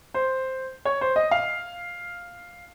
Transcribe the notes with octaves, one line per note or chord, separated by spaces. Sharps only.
C5
C#5
C5
D#5
F5